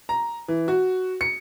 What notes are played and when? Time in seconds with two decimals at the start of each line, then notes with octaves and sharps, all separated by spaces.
0.09 A#5
0.48 E3
0.68 F#4
1.21 C#7